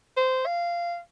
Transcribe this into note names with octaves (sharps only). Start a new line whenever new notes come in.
C5
F5